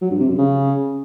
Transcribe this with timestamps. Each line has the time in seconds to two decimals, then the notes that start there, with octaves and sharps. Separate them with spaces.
0.02 F#3
0.11 G2
0.20 C3
0.29 F#2
0.38 C#3